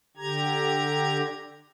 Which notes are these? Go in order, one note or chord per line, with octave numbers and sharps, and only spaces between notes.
D3 G4 A#5 G#6